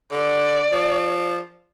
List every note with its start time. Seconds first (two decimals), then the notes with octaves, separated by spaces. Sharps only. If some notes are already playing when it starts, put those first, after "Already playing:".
0.11 D3 D5
0.72 F3